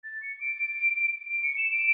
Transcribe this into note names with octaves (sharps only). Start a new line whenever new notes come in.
A6
C#7
D7
D7
C#7
E7
D7